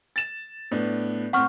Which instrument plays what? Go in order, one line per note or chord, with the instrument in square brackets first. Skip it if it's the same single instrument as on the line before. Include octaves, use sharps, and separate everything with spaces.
[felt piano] A6 E7
A2 B3 D4
[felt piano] A2 C4 [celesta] F#5 C#6 F6